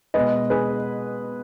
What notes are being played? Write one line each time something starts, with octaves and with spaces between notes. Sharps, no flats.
B2 G#3 B4 D#5
G#4 B4